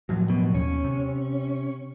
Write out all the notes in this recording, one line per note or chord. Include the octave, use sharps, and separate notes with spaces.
A2 F3 F#3
B2
D#2 C#4
C3